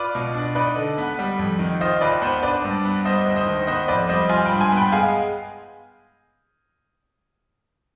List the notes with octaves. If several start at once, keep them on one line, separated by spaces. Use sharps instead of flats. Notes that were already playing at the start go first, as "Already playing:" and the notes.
Already playing: F4 B4 D5
B2
D4
D#4 B4 D5
D3
B3
G3
F2
D#3
F4 C5 D#5
D#2 B4 D5
B3 C5
D4 B4 D5
G2
B3
G3 C5 D#5
D2
C5 D#5
D#3
B3 C5 D#5
F2 B4 D5
G3 C5 D#5
F4 G#5 C6
G5 B5
G2
G#5 C6
B3 G5 B5
G#3 F5 G#5